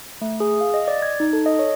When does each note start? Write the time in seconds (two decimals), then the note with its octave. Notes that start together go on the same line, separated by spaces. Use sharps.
0.21 A3
0.40 G#4
0.61 F5
0.74 D#5
0.88 D5
1.02 G#6
1.20 D#4
1.33 A4
1.46 D#5
1.59 C#5